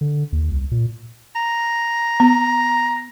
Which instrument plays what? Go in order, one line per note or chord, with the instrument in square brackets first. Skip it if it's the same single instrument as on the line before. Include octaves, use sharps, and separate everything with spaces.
[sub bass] D3
D#2
C2
A#2
[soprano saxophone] A#5
[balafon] B3